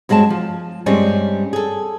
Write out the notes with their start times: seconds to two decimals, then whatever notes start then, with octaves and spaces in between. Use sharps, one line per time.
0.09 G2 F#3 G#3 C4 A5
0.30 F3
0.86 G2 G3 G#3 C4 C#4
1.53 G#4 A4